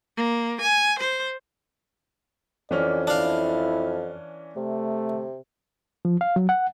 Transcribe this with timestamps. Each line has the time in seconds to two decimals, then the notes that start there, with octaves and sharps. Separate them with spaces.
0.17 A#3
0.61 G#5
0.99 C5
2.71 F2 E3 C#4 D5 F6
3.07 D4 E4 F5
4.57 C3 A3
6.05 F3
6.21 F5
6.36 F#3
6.49 F#5